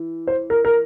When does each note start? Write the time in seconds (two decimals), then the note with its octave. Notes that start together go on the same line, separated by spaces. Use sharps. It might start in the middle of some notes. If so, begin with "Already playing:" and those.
Already playing: E3
0.27 C5
0.50 A#4
0.65 A#4